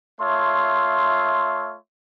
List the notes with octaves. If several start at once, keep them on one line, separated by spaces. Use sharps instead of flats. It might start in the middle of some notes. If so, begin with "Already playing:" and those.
A3 F4 C#5 E5 C6